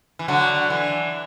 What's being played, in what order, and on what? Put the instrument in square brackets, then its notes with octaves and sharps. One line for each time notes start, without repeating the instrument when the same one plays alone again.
[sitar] E3
D3 F#3
E3